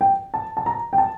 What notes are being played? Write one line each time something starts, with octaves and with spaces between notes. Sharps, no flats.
G5
A5
A5
A#5
G5
A5